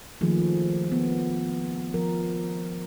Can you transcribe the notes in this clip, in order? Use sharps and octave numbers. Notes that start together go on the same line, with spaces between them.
D#3 F3 A3 A#3 G#4
B3
F3 A#4